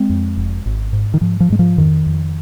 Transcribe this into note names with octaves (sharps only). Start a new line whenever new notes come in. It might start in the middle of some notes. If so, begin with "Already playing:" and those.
Already playing: G#3 C4
F2
F1
G#1
G#2
D#3
G#2 F3
F3
G#2 G#3
F3
F2 D#3
F2